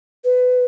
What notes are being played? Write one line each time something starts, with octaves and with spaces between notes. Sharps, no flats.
B4